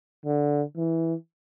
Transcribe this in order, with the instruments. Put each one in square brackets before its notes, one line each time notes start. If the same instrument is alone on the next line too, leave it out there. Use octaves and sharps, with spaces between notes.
[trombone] D3
E3